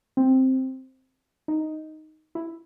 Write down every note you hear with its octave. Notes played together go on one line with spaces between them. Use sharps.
C4
D#4
E4